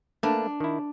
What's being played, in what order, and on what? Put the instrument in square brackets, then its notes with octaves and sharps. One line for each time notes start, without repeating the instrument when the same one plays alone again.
[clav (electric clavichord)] A3 A#3 B4 [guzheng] D4
[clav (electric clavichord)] D#3 E4